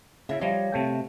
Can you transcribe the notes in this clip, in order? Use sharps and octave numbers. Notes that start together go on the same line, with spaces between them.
C#3 E4 E5
F3 G3 C#5 D#5 F5
C3 A3 G5